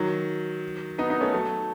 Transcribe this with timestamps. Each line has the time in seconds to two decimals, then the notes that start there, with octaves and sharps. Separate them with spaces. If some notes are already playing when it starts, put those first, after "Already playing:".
Already playing: D#3 F#3
0.98 B3 D#4
1.10 B3 D#4
1.21 A3 C#4
1.33 F#3 A3